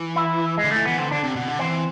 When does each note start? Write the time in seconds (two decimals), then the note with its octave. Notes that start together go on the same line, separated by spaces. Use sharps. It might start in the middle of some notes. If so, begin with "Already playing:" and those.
Already playing: E3
0.16 E4
0.58 G#3
0.64 D3
0.72 E3 A3
0.85 E3 B3
0.99 D3 C4
1.11 D3 D4
1.23 C3
1.36 B2
1.48 D3
1.59 E3 C4